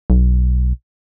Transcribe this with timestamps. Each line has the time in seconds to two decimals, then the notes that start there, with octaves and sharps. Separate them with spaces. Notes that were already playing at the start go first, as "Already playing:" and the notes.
0.10 B1